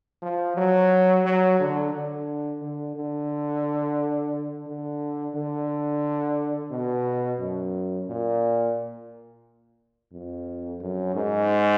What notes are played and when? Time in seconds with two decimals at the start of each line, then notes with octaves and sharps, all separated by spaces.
0.22 F3
0.57 F#3
1.25 F#3
1.60 D3
1.94 D3
2.62 D3
2.96 D3
4.67 D3
5.35 D3
6.71 B2
7.39 F#2
8.08 A#2
10.13 F2
10.80 F#2
11.15 G#2